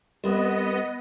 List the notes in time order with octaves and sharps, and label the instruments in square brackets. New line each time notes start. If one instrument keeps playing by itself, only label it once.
[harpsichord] C2 [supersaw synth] B3 D#5